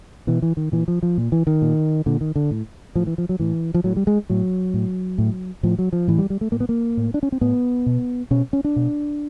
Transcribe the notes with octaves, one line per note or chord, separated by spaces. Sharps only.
B2 E3
E3
D#3
A#2 E3
F3
F3
A#2
E3
D#3
A#2
A#2 D3
D#3
D3
A2
A2 F3
E3
F3
F#3
A2 E3
F3
A2 F#3
G3
G#3
A2 F#3
A2
A2
A2 F3
F#3
F3
A2 E3
G3
G3
A3
A2 A#3
B3
A#3
A2
D4
C#4
C4
A2 B3
B2
B2 C#4
C#4
D4
B2